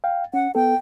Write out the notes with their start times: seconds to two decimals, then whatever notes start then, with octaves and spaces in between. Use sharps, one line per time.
0.04 F5 G5
0.34 C#4 F#5
0.55 B3 A4 G5